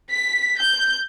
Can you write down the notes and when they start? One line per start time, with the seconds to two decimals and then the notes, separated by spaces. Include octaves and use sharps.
0.11 B6
0.58 G6